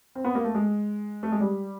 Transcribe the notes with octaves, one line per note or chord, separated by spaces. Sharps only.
C4
B3
A#3
A3
G#3
A3
G#3
G3